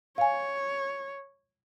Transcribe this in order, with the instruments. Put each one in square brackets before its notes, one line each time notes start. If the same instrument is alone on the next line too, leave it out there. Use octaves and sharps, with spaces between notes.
[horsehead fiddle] C#5 [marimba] F5 G#5